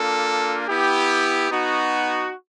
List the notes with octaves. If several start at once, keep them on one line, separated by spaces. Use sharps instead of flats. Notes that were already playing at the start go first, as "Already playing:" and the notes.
Already playing: A#3 D4 F4 A4
B3 E4 G4
B3 D#4 F#4